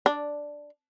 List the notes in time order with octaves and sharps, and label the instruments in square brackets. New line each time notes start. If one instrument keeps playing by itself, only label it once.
[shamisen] D4